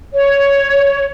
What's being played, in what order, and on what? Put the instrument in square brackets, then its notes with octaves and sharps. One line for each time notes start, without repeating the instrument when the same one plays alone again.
[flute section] C#5